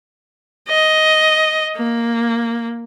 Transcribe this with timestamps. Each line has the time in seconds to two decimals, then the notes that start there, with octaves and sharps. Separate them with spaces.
0.69 D#5
1.77 A#3